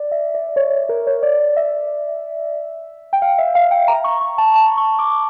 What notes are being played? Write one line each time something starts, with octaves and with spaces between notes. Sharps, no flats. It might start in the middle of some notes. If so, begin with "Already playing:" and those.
Already playing: D5
E5
D5
C#5
C#5
A#4
C#5
D5
E5
G5
F5
E5
F5
G5
A#5
C#6
C#6
A5
A5
C#6
D6